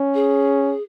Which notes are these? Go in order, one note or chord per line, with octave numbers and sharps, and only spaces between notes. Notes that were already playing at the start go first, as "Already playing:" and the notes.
Already playing: C#4
G#4